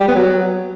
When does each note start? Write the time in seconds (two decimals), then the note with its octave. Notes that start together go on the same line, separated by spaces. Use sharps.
0.01 G3
0.08 B3
0.16 F#3